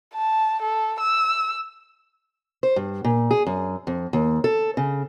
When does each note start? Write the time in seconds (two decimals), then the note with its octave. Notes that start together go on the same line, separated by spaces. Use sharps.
0.14 A5
0.62 A4
1.00 E6
2.63 C5
2.76 G2
3.04 A#2
3.31 G#4
3.47 F#2
3.87 F2
4.13 D#2
4.44 A4
4.77 C#3